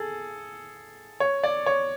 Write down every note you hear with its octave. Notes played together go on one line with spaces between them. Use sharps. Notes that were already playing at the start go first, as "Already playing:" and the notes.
Already playing: G#4 A4
C#5
D5
C#5